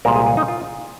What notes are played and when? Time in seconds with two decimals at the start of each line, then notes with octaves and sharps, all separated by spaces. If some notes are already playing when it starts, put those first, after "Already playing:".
0.05 C2 A#2 G#3 A#4
0.15 G#4
0.26 G#4
0.37 D#4
0.48 F4